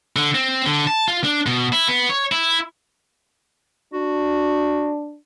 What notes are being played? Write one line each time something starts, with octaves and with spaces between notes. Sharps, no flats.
D3
C4
D3
A5
F4
D4
B2
E4
B3
C#5
E4
D4 F#4